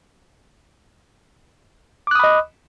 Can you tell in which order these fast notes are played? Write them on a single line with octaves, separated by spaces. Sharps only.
D6 F#6 D#6 B5 D#5